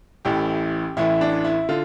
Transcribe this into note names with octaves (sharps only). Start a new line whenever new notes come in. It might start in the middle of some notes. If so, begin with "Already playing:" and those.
A1 A2 E3 G4
A1 A2 E3 E4
D4
E4
D3 F4